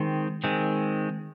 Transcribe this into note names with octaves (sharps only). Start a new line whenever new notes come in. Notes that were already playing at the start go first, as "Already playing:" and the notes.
Already playing: D#3 G#3 C4
D#3 G#3 C4